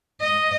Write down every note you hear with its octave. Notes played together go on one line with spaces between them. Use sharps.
D#5